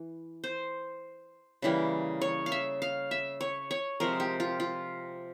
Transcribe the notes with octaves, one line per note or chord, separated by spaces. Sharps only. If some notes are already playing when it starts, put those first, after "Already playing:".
Already playing: E3
C5
C#3 E3 G3 A#3
C#5
F5
E5
F5
E5
C#5
C#5
C3 F3 G#3 A#4
G4
F4
F4